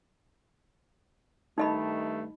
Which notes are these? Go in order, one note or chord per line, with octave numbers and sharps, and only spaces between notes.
G2 D#3 A3 D#4 D#5 B5